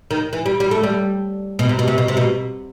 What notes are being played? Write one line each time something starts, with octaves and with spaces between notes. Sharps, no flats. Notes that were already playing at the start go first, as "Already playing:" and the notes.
D#3
E3
G3
G3
A3
G3
B2
C3
B2
C3
B2
C3
B2